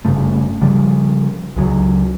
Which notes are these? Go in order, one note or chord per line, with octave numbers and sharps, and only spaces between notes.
F#1 G2 C#3 A3
C#3 F3 G3
C#2 C#3 F3 F#3